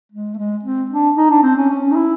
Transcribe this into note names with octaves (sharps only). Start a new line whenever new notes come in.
G#3
A3
G#3
C4
D4
D#4
D4
C4
C#4
C#4
D#4
E4